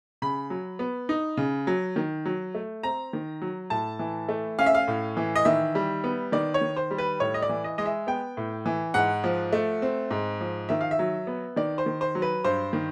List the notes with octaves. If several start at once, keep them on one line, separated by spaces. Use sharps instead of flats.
C#3 B5
F#3
B3
D#4
C#3
F#3
D#3
F#3
A3
C4 A#5
D#3
F#3
A2 A5
E3
A3
C#4 F5
E5
F5
A2
E3
D#5
D#3 E5
G3
B3
D#3 D5
C#5
D#3
C5
G3
B4
A2 C#5
D#5
D5
E3
D#5
G#3 D#5
E5
B3 G5
A2
E3
G#2 F#5
F3
A3
C4
G#2
F3
D#3 E5
F5
E5
F#3
B3
D#3 D5
C5
D#3
C5
F#3
B4
G2 C5
D#3